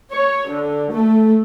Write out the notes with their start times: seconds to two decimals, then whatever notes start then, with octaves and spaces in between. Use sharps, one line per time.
0.13 C#5
0.50 D3
0.92 A3